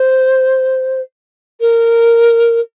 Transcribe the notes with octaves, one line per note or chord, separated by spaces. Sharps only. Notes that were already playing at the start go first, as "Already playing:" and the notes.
Already playing: C5
A#4